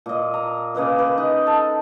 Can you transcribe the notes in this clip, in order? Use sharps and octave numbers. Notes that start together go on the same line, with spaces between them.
A#2 D#5
A#5
C#3 A#3 B4 D#5
B4
D#4
A4